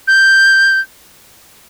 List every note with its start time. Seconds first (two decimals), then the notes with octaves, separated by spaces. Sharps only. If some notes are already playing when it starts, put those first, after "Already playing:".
0.08 G6